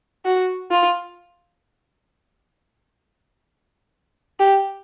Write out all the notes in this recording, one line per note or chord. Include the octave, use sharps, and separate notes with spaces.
F#4
F4
G4